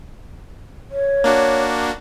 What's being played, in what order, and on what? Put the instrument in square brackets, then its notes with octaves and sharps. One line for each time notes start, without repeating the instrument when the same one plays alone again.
[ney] C#5
[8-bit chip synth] A#3 D4 F#4